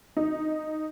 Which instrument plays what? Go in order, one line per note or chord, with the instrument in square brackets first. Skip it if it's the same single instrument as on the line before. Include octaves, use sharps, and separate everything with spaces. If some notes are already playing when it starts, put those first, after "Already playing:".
[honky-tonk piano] D#4